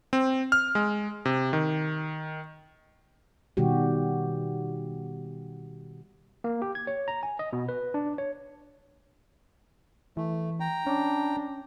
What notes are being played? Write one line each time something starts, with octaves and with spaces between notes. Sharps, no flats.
C4
F6
G#3
C3
D#3
B2 D#3 G3 F#4 G4
A#3
G4
G#6
C#5
A#5
G#5
D#5
B2
B4
D4
C#5
E3 A3
G5 A#5
C#4 D4